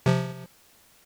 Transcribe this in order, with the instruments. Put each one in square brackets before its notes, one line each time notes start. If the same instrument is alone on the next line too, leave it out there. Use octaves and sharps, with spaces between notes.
[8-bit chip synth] C3 F3